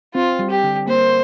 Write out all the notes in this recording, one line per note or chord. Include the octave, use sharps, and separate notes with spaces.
C4 F4
G3
G4
D3
A#3 C5